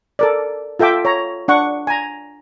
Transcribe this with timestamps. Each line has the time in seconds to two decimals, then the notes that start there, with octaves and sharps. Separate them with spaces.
0.19 A4 A#4 D5
0.79 F4 A4 E5 G5 D6
1.05 C#5 A#5
1.48 D4 F#5 C#6
1.87 G#5 A#5